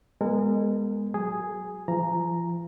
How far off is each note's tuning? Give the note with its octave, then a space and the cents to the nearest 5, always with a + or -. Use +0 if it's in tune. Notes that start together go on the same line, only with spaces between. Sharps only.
G#3 -15 B3 -10 A#4 -40
F#3 +0 G#4 +0
F3 -35 A#5 +0